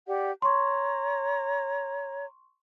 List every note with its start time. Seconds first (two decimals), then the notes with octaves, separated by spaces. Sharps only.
0.07 G4 D5 F#5
0.42 C#5 A#5 C6 C#6